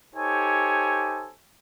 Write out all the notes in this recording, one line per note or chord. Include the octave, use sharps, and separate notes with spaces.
D#4 G4 A4 C5 C#5 G#5